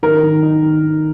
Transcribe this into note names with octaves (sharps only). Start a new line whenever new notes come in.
D#3 A#4
D#3
D#4
D#3
D#3